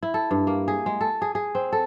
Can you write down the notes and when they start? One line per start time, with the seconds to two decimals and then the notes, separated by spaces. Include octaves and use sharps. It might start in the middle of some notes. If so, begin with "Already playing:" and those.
0.03 E4
0.14 A4
0.31 G2
0.47 A#3
0.68 G#4
0.86 G#3
1.01 A4
1.22 G#4
1.35 G#4
1.55 C4
1.72 A4